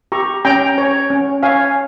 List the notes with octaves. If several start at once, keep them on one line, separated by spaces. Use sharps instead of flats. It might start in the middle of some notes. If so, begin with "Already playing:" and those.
G4 A#5 C#6
C#4 G5 A#5
C#5
C#4
C#5 F5 G#5